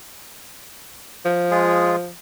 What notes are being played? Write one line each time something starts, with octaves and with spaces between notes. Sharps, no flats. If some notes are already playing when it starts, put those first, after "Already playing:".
F3
G#3 F4 G#4